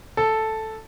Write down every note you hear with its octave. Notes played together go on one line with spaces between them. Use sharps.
A4